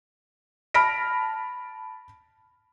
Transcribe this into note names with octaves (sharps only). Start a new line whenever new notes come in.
A5 B5 F6 A#6 B6 D7